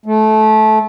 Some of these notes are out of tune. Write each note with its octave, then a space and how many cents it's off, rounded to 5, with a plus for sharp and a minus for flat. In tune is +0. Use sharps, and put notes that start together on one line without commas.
A3 -20